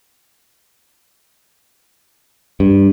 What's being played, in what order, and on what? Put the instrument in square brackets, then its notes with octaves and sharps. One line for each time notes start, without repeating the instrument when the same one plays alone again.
[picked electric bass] G2